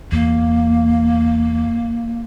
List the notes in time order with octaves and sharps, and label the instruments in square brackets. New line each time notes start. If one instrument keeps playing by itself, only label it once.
[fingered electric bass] E2 [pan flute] A#3